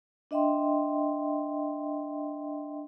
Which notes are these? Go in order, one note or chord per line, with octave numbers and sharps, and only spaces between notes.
D4 D#5 E5 G5 C6